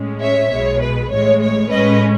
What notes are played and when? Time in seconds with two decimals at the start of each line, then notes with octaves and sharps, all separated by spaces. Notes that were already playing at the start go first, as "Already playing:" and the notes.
Already playing: A2 G#3 C#4
0.21 C#5 E5
0.51 B1 B2 G#3 C#5
0.81 B4
1.11 A1 A2 G#3 C#5
1.42 C#5
1.72 A2 G#3 C#4 B4 D#5